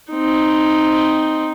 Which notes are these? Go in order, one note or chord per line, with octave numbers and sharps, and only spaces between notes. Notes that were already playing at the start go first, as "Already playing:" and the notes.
C4 D#4